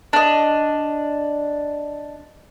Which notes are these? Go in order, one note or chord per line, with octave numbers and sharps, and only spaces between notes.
D4 D#5